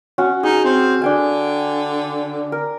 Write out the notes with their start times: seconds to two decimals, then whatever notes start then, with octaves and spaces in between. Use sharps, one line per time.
0.18 C#4 F#4
0.43 D#4 G#4
0.65 C4
1.02 D3 D4 G5 G#5
2.52 A#4